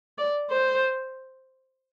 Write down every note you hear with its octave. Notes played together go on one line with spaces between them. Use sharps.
D5
C5